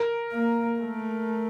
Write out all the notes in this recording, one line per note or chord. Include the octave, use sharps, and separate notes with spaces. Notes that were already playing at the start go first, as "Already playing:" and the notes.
Already playing: A#4
A#3
A3